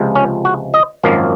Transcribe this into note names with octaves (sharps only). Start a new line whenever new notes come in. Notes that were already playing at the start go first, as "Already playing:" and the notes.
Already playing: C#2 C3 F3 G#3
C#4
F#4
D#5
G#1 F#2 F3 A#3 F5